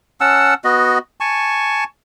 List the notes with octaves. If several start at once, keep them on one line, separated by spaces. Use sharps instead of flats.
C#4 F#5 A5 E6
B3 F#4 D#5
G#5 A5 C#6